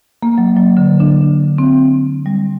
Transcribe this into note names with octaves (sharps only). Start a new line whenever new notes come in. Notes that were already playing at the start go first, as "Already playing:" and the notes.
A#3
F#3
F#3
D3
D4
C4
G3